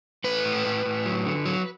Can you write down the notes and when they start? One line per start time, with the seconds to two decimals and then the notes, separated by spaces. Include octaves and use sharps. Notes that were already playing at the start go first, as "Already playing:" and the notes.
0.24 A3 B4
0.45 A2
0.66 A2
0.85 A2
1.06 F#3
1.26 D3
1.46 F#3